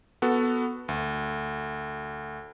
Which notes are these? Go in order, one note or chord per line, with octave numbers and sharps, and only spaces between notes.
B3 F#4 A4
D2